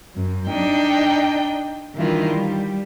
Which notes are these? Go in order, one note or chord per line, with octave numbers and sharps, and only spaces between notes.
F#2
D4 D#4 G5
D#3 E3 G3 D4 E4 F4
G3